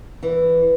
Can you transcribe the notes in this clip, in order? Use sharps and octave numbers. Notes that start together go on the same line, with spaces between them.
E3